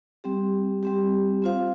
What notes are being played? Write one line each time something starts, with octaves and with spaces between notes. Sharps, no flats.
G3 C4 G4
G3 C4 G4
C4 F4 C5 F5